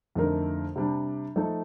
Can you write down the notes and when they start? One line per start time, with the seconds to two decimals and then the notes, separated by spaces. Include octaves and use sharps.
0.15 F2 D3 A3 D#4 A#4
0.76 C3 G3 D4
1.36 F3 A3 D#4 A4